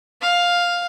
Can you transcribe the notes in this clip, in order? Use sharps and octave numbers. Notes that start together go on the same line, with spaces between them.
F5